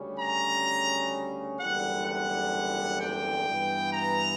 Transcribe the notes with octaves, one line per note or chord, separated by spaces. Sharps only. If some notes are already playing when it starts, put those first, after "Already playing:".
Already playing: D2 C#3 G3 C#4
A#5
F#1 E2 D3 G3 F#5
F#5
G5
G2 E3 B3
A#5